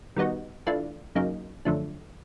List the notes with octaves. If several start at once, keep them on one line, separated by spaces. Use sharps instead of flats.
D#3 G3 B3 D#4 F#4
E3 A3 D4 F4
F#2 C#3 F#3 A#3 D#4
F#2 D3 F3 A3 D4